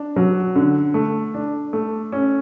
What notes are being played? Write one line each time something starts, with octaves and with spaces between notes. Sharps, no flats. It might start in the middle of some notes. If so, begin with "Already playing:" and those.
Already playing: D4
F#3
D3
A3
D4
A3
C#4